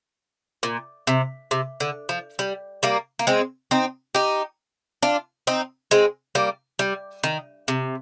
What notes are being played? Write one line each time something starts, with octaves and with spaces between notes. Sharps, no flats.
A#2
C3
C3
D3
F3
G3
G3 A#3
A#3
G#3 C4
C4 D#4
D#4 G4
D4 F4
C4 D#4
G#3 C4
G3 A#3
G3
D#3
C3